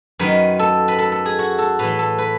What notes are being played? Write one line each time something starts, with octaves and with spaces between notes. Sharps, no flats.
F#2 D#3 B4
A4
B4
A4
A4
G#4
F#4
A4
A2 E3 B4
A4
B4